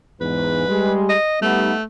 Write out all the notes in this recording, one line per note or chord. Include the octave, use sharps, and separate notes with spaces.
E2 G#2 B4
G3 G#3
D#5
G3 A3 B3 D#4